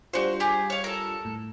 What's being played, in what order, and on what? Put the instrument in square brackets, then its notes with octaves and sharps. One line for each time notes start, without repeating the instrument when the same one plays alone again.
[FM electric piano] G3 D4 F4 [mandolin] F#4 C5
[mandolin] G4 G#4
C#5 F5
A4 A#4
[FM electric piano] A2